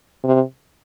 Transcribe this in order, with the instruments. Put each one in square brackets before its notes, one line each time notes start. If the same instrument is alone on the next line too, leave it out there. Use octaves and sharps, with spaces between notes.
[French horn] C3